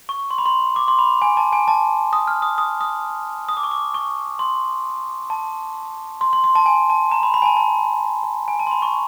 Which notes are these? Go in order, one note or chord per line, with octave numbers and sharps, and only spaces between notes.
C#6
C6
B5
C6
D6
C6
B5
G#5
A5
G#5
A5
D#6
F6
D#6
D#6
D#6
D#6
D6
C#6
D6
C#6
C6
A5
C6
C6
C6
A5
G#5
A5
A#5
B5
B5
G#5
A5
A5
G#5
A5
C6
B5
C#6